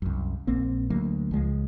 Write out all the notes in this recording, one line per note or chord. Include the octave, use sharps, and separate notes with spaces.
C2 F#2
A#1 A#3 C4
D2 F#3 A#3
C#2 F3 G#3